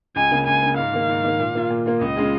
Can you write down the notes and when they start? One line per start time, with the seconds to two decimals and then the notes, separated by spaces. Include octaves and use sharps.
0.16 C#2 G#5
0.32 C#3 A#3
0.47 C#2 G#5
0.62 C#3 A#3
0.77 G#2 F5
0.93 D#3 A#3
1.09 G#2
1.24 D#3 A#3
1.40 A#2
1.55 A#3 F4
1.70 A#2
1.86 A#3 F4
2.01 C#2 D#5
2.16 C#3 G#3 F4 G#4